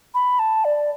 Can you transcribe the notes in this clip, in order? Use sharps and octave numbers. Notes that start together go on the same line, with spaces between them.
B5
A5
D5